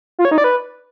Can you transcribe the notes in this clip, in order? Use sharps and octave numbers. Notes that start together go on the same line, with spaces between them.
F4
C#5
D#4
D5
B4